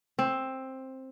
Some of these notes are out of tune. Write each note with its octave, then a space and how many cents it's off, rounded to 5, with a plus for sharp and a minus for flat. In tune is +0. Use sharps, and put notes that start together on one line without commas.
C4 +10